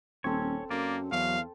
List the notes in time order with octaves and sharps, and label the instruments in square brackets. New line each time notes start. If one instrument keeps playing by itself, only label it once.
[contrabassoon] D#1 [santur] C4 A4 [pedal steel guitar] C#4 C#5
[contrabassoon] F#2 [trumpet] A#3 [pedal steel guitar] D5
[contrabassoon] E2 [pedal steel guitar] F#3 [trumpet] F5